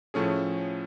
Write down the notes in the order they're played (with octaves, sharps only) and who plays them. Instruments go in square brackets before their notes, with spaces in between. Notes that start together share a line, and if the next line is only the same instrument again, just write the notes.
[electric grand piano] A2 F3 A3 C#4 G#4